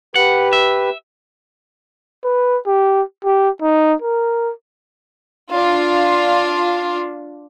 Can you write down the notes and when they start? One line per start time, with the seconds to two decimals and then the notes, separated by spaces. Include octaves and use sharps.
0.15 G4 B4 F#5
0.53 E5
2.24 B4
2.66 G4
3.25 G4
3.61 D#4
4.02 A#4
5.51 D4 F4